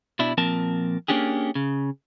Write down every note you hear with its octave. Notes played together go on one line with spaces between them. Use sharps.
B2 D4 E4
A#2 F3 C4 A#4 A5
A#3 C#4 D4 G4 G#4
C#3